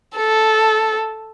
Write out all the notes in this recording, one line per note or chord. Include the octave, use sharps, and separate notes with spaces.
A4